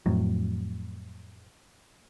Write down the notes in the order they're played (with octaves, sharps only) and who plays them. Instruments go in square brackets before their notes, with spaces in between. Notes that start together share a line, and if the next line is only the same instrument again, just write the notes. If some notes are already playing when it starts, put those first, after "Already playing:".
[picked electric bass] F2 A2 F#3